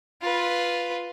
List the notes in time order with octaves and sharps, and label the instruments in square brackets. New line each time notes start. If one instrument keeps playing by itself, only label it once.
[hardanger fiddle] F4 B4